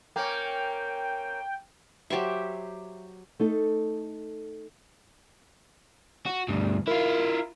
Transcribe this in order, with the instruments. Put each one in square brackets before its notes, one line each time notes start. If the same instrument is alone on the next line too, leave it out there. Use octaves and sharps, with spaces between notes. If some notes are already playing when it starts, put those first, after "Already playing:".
[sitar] A#3 C#4 [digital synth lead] G5
[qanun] F#3 G4 C5 E5
[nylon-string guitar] A3 D#4 A4
[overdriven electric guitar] F#4
D2 G2
[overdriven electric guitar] E4 F4 [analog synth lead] A#4